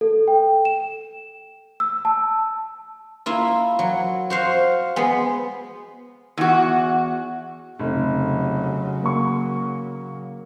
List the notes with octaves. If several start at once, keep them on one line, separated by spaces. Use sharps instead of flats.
A4
G5
E7
E6
A5
A#3 E4 F4
F#3
F#4 C5 F5
G#3 B3
E2 F#4
F1 C#3 F#3
A#3 C#6